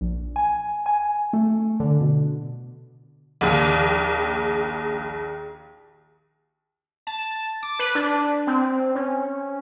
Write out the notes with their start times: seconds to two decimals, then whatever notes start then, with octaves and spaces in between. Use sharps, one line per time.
0.01 A#1
0.36 G#5
0.86 G#5
1.33 A3
1.80 D3
2.01 B2
3.41 A#1 D#2 G#4
7.07 A5
7.63 D6
7.79 B4
7.95 D4
8.47 C4
8.95 C#4